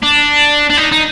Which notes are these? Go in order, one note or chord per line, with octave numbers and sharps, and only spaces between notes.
D4
D4
D#4
D#4